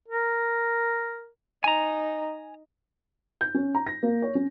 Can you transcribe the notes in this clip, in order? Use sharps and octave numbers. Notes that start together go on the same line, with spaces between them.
A#4
D#4 G#5 A#5
G6
C#4
A#5
A#6
A#3
C#5
C#4